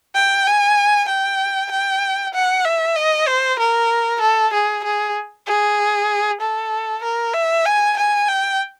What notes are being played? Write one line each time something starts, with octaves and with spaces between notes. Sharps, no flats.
G5
G#5
G5
G5
F#5
E5
D#5
C5
A#4
A4
G#4
G#4
G#4
A4
A#4
E5
G#5
G#5
G5